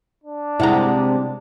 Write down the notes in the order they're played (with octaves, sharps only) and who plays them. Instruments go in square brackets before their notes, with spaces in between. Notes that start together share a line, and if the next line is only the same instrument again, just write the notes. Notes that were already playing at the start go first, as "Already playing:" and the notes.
[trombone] D4
[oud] C3 G#3 [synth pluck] E4 F#5 A#5